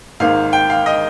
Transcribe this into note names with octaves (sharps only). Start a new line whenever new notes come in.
G#1 G#2 D#3 A#3 F5
G5
F5
D#5